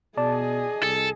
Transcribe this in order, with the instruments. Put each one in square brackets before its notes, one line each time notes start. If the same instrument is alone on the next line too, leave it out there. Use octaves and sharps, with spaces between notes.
[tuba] B2 [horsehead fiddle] G#4 D#5 [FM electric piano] D5 A5
[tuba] C2 [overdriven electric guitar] A4